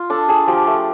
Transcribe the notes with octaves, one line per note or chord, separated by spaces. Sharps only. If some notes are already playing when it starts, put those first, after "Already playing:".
Already playing: F4
D4 A4
D4 G#4
F3 G4
A3